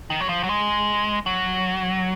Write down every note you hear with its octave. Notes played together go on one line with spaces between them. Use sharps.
D#3
F#3
F3
F#3
G#3
F#3